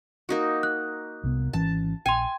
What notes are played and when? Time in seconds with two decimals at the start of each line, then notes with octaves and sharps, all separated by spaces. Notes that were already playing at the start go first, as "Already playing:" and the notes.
0.29 A#3 D#4 F#4
0.63 F#6
1.23 C2 C3 B3
1.53 G#1 E3 C#4 A5
2.06 A#1 G5 G#5 C6